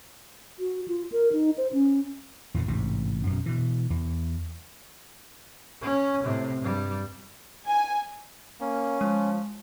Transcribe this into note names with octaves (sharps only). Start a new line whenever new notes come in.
F#4
F4
A#4
D#4
C5
C#4
E2 A#2 D3
A1 G#2 C3
F#2 B2
B2 E3
E2
C#4
A2 C3
G2 G3
G#5
A#3 C#4
F3 G#3